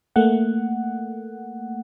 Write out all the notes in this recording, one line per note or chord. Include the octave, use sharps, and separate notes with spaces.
A3 A#3 F#5